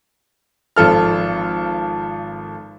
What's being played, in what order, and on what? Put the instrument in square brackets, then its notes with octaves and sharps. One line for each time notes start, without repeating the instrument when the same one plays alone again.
[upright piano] G#1 F3 A4 F6